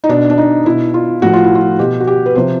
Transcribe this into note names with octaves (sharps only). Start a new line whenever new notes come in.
D#4
B2 D4
D4
D#4
B2 E4
F4
A2 F3 F#4
F4
E4
F4
B2 G4
F#4
G4
B4
C3 F3 C5